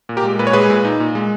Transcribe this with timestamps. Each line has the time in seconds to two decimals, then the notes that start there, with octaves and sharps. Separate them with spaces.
0.09 A#2
0.17 G4 A#4
0.24 G#3
0.39 A#2 B4
0.47 C#5
0.53 G#3 G#4 B4
0.70 A#2
0.85 D#4
1.00 A#2
1.15 G#3